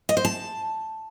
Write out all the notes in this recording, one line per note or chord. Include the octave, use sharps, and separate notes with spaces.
D#5
C5
A5